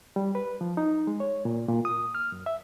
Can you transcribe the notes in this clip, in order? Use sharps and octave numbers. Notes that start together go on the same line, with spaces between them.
G3
B4
F3
D#4
G#3
C#5
A#2
A#2
D#6
F6
F#2
E5